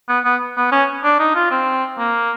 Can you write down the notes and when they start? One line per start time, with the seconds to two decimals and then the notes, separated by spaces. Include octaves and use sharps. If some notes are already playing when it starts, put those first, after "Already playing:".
0.08 B3
0.24 B3
0.57 B3
0.72 C#4
1.04 D4
1.19 D#4
1.35 F4
1.51 C4
1.98 A#3